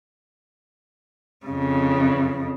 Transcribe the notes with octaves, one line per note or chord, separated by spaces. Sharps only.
F2 C#3